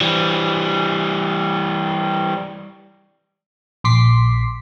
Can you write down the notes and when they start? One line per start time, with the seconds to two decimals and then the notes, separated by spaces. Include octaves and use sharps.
0.01 E3 G3
3.84 A#1 C6 D6 B6 C7